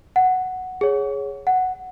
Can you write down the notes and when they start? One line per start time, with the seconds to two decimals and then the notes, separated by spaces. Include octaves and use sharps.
0.16 F#5
0.81 G#4 C#5
1.47 F#5